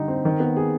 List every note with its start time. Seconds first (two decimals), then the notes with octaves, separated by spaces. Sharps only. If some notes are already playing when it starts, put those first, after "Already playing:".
Already playing: D3 G3 D#4
0.08 C4
0.25 D#3
0.40 B3
0.56 G#4